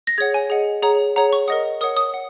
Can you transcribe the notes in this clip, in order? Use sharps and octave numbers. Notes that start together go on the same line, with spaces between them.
A#6
G#4 C#5 F#5 G#6
G#5
G#4 D#5 F#5
G#4 C#5 F#5 A#5
G#4 C#5 F#5 A#5
C#6
A#4 D#5 F#5 D#6
A#4 C#5 F#5 D#6
D#6
F#5